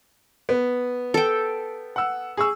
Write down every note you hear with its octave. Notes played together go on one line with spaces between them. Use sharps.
B3
A4 G5
F#5 E6
G#4 C#6 E6